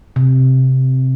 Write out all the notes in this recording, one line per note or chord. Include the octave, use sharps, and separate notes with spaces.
C3